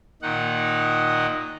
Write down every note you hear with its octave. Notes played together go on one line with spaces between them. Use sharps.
A#2 D#3 D#4 F#5